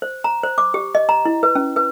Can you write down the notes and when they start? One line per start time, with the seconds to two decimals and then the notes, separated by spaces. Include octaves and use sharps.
0.02 C5
0.24 A#5
0.44 C5
0.58 D6
0.74 G4
0.95 D#5
1.09 A#5
1.25 E4
1.43 B4
1.55 C#4
1.76 B4